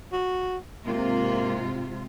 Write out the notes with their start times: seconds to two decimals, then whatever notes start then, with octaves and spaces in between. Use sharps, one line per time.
0.13 F#4
0.86 G#2 C3 A#3 F4